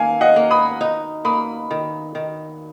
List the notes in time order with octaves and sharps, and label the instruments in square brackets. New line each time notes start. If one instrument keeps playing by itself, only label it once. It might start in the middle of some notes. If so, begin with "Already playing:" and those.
Already playing: [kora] D#3 A#3 [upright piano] F5 G#5
[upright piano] D#5 F#5
[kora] A#3
[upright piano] B5 D#6
[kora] D#4
[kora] A#3 [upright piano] B5 D#6
[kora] D#3
D#3